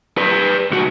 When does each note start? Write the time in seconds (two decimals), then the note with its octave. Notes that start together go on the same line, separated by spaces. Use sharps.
0.18 B4 D5
0.71 C2 F#4